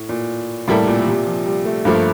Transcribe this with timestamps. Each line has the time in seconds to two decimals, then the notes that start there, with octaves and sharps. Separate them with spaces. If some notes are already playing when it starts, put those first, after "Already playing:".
Already playing: A2
0.09 A#2
0.68 A2 C3 G3 A#3 E4 A4
0.83 C3
0.87 A#2
1.07 C3
1.26 F3
1.46 G3
1.65 A3
1.85 G2 F3 A3 A#3